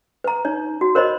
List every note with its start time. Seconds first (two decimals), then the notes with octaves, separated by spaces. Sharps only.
0.24 B4 A#5
0.45 D#4 C#5
0.81 F#4
0.95 A#4 C5 C#5 D#5 B5